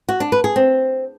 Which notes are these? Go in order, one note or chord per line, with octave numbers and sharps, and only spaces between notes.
F#4
D4
B4
G#4
C4